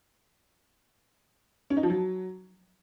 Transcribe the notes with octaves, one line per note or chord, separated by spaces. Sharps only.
C#4
D#4
F3
F#3